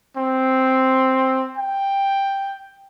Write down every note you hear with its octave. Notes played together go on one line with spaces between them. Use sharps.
C4
G5